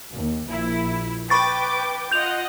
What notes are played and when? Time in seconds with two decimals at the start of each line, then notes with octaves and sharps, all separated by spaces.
0.13 D#2
0.50 A#1 E4
1.30 B4 G5 B5 C#6 D6 A6
2.11 F4 D#5 F#5 G6 F7